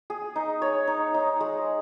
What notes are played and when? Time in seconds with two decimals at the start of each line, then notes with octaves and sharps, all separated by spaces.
0.10 G#4
0.36 D#4
0.62 C#5
0.87 D#4
1.14 D#4
1.40 G#3